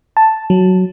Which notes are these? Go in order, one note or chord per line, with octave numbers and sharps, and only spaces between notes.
A5
F#3